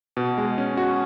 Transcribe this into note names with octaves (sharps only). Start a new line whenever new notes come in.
B2
G#3
C#4
F#4